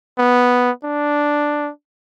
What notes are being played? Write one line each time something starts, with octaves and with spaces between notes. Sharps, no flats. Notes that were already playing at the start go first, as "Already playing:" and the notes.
B3
D4